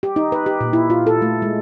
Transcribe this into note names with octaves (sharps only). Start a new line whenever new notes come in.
G4
D#4
B4
G4
A#2
E4
F4
A4
A3
G#3